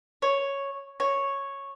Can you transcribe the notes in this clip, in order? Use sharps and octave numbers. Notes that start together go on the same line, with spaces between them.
C#5
C#5